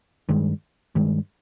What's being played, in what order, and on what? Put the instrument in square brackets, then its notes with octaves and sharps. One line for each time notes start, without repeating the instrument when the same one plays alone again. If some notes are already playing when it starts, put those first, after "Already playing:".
[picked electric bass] G2 D#3 G#3
G2 D#3 G#3